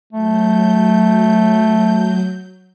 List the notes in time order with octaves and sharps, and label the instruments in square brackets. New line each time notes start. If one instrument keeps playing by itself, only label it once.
[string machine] F#3 G6 [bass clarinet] A3